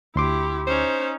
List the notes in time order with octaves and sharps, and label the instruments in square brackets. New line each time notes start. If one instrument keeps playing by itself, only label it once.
[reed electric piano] D2 C6 D6 [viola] E4 G4
[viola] C#4 D#4 [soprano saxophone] C5